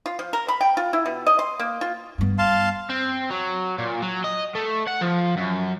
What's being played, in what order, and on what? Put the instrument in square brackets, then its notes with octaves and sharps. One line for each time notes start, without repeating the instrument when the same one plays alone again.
[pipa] F4
F3
A#4
B5
G5
F4
E4
B2
D#5
C6
A#3
F4
[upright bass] G2 B3
[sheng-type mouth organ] F5 A5 C6
[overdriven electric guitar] C4
F#3
A#2
F#3
D#5
A3
F#5
F3
F#2